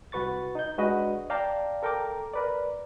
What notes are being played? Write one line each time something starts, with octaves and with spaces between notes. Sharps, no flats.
C2 F#4 B4 C#6 A6
D#4 G6
G#3 D4 F#4 B4 D#5
D5 F5 G5 A5 A#5
A4 A#4 G5 A#5 D6
A#4 B4 D5